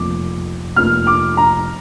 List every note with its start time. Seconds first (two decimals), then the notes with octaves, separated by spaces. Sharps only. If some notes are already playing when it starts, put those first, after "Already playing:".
Already playing: F1 F2 F3 A#3 D6
0.76 F1 F2 F3 A#3 F6
1.07 D6
1.37 A#5